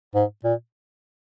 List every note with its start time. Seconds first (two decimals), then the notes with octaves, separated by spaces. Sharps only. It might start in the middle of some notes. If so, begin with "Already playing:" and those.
0.15 G#2
0.44 A#2